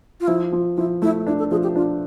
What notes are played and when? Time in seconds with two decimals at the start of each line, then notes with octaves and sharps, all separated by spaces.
0.21 F4
0.27 F3 E4
0.52 F3
0.77 F3 E4
1.02 A3 E4
1.27 D4 E4
1.39 A4
1.51 F3 G#4
1.63 G4
1.76 D4 F4